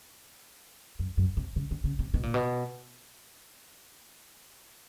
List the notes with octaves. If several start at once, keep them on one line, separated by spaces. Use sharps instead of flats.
F#2
F#2
C3
C#3
D3
C#3
C3
B2
A#2
B2